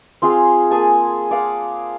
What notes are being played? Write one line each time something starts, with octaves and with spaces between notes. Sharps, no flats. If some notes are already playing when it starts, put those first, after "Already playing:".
C4 F4 G#4 F5
A#3 G#4 G#5 A5
D5 F5 F#5